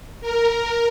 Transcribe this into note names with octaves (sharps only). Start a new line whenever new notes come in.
A#4